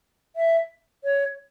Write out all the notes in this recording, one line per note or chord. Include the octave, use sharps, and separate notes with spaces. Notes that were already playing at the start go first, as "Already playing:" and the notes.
E5
C#5